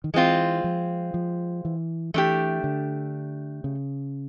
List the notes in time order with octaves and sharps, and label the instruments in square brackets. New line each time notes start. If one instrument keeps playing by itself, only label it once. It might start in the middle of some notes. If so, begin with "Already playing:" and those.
[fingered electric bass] D#3
[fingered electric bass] E3 [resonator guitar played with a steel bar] G#3 C4 F4
[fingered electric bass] F3
F3
E3
[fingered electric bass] E3 [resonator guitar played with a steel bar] A3 D4 G4
[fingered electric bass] D3
C#3